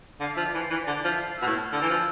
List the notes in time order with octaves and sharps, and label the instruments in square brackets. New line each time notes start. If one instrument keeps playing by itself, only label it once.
[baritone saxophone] D3 [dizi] F5
[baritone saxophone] F3 [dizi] E5
[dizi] D5
[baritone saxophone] E3
[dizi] C5
[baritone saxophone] E3 [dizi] B4
[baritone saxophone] D3 [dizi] D5
[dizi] D5
[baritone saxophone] F3
[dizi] E5
F5
F6
[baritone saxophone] B2 [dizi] E6
[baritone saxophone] A2
[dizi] F6
[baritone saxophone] D3 [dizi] E6
[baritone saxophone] E3
F3